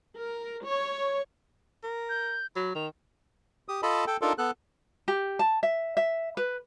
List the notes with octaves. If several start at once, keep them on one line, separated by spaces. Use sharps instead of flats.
A#4
C#5
A#4
G6
F#3 B5
D#3 F7
G4 D#6
F4 A4 D#5 A5 B5
A4 G5
D4 D#4 F4 A4 A#4
B3 A4 F#6
G4
A5
E5
E5
B4